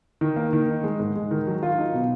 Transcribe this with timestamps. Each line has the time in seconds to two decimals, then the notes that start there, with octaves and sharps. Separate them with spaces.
0.21 D#3
0.36 A#3
0.53 D#3
0.68 D#4
0.84 G#3
0.99 G#2
1.16 G#3
1.31 D#3
1.47 F#3
1.63 F4
1.78 D#4
1.94 B2